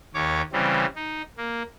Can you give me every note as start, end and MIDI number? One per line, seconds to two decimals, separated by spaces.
0.14 0.42 39
0.14 0.42 73
0.14 0.42 86
0.52 0.86 49
0.52 0.86 52
0.52 0.86 55
0.52 0.86 60
0.96 1.22 63
1.38 1.63 58